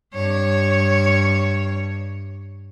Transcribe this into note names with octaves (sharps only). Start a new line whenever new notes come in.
G2 C#5